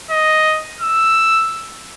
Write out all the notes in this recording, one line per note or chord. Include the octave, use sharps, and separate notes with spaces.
D#5
E6